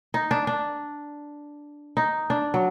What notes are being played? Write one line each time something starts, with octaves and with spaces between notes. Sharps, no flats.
D#4
D4
D4
D#4
D4
F#3